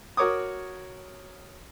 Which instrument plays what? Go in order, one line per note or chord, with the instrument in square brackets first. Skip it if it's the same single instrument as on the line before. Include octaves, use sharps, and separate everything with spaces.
[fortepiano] F#4 A#4 C#5 D6 D#6